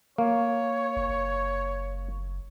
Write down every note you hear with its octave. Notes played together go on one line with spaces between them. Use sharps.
A#3 C#5
F#1